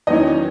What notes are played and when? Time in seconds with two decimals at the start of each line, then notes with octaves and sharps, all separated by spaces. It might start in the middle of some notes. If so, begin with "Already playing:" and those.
0.07 E2 D#3 F#3 C#4 D#5